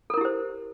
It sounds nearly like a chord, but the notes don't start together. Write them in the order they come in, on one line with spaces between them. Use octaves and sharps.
A4 A#4 E4 G4 C5